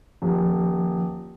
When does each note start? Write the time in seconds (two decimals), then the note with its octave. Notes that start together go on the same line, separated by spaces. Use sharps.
0.22 D#1 F3